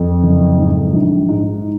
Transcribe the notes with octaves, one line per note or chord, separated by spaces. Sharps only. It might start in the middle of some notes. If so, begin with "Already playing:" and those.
Already playing: F2
F#1
G#2
A#1
G#2